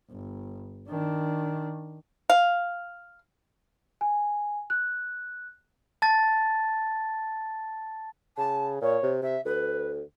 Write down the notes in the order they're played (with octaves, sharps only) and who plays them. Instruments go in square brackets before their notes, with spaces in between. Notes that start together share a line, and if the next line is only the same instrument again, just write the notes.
[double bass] G1
D#3 D4
[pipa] F5
[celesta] G#5
F#6
[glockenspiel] A5 A6
[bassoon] C#3 [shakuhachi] A5
[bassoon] A#2 [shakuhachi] C#5
[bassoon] C3
[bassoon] C3 [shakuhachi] E5
[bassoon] D2 [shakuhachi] B4